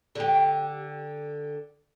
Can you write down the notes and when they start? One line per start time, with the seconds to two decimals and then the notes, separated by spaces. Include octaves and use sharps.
0.15 D3 G4